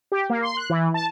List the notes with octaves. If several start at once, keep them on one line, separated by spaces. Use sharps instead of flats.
G4
A#3
C6
F#6
E3
A5